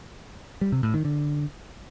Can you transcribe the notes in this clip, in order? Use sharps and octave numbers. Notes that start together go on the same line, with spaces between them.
G3
C3
A2
D#3
D3